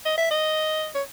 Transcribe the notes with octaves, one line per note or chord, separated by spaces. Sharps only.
D#5
E5
D#5
C#5